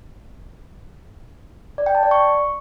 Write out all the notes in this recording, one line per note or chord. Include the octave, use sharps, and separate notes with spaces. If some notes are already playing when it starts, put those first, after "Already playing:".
D5
G5
A5
D5
C#6